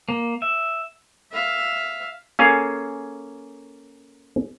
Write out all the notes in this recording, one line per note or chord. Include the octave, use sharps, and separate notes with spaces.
A#3
E5
E5 F5
A#3 C#4 G#4 A4 F5 G#5